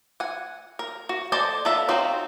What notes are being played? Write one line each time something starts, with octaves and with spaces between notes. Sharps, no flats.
F#5 G#5
A#4
F#4
A4 C5 D5 D#5 G#5
F3 B3 A4 A#4 E5
F#3 C4 D#4 F4